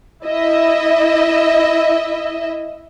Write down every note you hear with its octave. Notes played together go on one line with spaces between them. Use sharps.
E4 D#5 E5